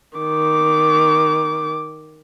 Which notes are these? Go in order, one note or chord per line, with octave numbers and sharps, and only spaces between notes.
D#3 D6